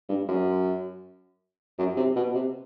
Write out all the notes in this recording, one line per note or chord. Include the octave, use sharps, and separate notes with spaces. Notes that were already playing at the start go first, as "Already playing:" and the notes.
G2
F#2
F#2
C3
B2
C3